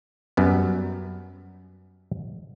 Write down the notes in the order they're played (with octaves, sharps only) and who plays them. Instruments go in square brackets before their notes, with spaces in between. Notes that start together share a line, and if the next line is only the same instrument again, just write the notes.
[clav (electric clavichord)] F#2 G3 B3